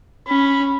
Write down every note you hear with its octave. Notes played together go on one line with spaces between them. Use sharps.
C#4 B5